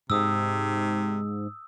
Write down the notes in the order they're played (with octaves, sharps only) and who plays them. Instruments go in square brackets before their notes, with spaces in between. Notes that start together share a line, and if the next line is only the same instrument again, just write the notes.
[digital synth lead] G#2 [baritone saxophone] C3 [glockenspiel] D#6 E6